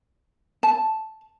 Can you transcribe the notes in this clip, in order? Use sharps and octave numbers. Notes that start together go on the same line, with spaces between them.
A5